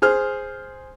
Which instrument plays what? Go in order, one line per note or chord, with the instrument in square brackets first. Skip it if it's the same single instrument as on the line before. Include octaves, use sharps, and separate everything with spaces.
[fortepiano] G#4 C5 F6